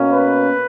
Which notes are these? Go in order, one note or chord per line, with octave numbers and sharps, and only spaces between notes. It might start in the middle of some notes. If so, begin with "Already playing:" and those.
Already playing: B2 A#3 C#4
B4